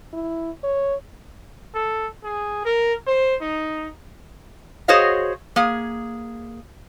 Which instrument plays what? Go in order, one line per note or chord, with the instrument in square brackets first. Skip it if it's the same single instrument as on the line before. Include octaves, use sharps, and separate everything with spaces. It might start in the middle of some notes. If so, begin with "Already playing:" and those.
[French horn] E4
C#5
[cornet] A4
G#4
A#4
C5
D#4
[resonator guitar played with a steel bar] F#4 G#4 C5 C#5 D#5 F5
A#3 G#4